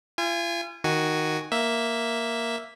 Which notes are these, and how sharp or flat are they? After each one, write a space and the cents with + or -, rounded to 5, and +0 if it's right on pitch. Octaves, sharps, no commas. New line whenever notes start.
F4 -40 G#5 -25
D#3 +0 F#4 +0 G#5 +0
A#3 +0 E5 +0